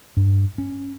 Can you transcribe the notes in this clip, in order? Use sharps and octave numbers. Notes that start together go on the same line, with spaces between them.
G2
C#4